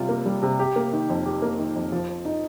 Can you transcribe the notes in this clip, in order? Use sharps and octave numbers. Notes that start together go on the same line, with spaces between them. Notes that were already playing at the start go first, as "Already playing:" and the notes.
Already playing: C3 G3 F4
A#3
G3
C3
G4
A#3
D#3
F2
G4
A#3
D#3
F2
F3
C5
D#4